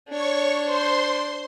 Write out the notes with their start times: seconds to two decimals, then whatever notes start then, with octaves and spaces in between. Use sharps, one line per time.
0.09 D4 C#5 C#6
0.65 C5 C6